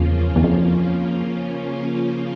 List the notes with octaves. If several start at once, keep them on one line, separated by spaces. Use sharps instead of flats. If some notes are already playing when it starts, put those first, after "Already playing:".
Already playing: E2 C#3 F3 A#3 C#4 F4
E2
F2